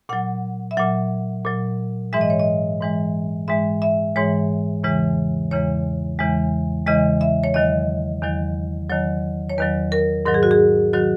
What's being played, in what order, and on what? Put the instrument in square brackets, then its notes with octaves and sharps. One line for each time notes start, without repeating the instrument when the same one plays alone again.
[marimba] A#2 F#3 F#5
E5
A#2 F#3 F#5
A#2 F#3
G#2 E3 G#3 E5
D#5
C#5
D#5
G#2 E3 G#3
G#2 E3 G#3 E5
E5
G#2 E3 G#3 C#5
E2 C#3 E3 G#3
E2 C#3 E3 G#3 C#5
E2 C#3 E3 G#3
E2 C#3 E3 G#3 D#5
E5
C#5
E2 D#3 F#3 D#5
E2 D#3 F#3
E2 D#3 F#3 C#5
C#5
E2 D#3 F#3 B4
A#4
G#2 D#3 F#3 A#4
G#4
F#4
G#4
D#3 F#3 F#4